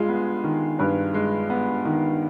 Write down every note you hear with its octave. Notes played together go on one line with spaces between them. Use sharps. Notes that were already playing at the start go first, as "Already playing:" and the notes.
Already playing: G2 G#3 F4 G#4
B3
D#3
G2 B4
G#3
B3
D#3